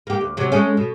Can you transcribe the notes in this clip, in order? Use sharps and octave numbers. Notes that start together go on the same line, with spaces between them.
A#3 G4
D2
C3 F#3 C#4
G#3 A3 C#4
B2